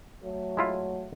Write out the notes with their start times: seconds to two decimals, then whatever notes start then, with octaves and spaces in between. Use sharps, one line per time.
0.24 F#3 A3
0.57 G#3 E4 F4